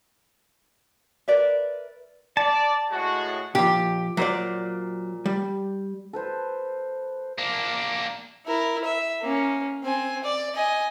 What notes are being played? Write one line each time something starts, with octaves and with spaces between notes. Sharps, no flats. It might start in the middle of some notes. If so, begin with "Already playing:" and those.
A#4 B4 D5 E5
D5 A5
A2 G#3 F#4
A#2 F3 G4
A#2 F#3 C5 D5
G3
A4 B4 C5
A#3 D4
E4 A#4
E5
A#3 C#4
C4 G#5
D5
D#5 G#5